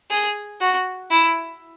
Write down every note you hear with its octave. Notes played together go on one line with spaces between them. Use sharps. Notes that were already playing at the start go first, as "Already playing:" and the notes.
G#4
F#4
E4